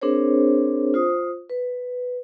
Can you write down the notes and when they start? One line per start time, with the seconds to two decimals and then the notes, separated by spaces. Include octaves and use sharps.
0.02 C4 D4 G#4 A#4 C5 C#5
0.94 F4 C5 D#6
1.50 B4